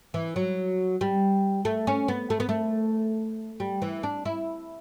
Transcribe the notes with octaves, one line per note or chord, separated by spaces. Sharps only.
E3
F#3
G3
A3
C#4
B3
A3
B3
A3
G3
E3
D4
E4